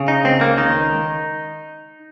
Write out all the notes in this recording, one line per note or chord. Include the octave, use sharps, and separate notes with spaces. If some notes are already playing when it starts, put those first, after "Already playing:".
Already playing: C#3
D#4
C#2 C4
A#3
D#3 D#4